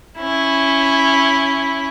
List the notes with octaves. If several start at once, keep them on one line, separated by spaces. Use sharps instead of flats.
C#4 E4